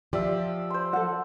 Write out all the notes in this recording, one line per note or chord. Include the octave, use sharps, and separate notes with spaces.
F3 G4 D5 E5
C5 C6
A4 F#5